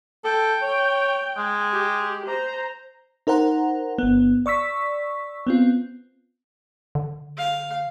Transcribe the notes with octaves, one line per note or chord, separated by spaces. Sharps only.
A4 G5
C#5
G#3
G4
C5 A#5
D#4 A#4 C5 F#5 A#5
G1 B3
D5 C#6 E6 B6
B3 C4 F4
D3
F5